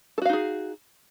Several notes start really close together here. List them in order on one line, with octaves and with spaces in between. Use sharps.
A4 F#4 F5 D#4 G#4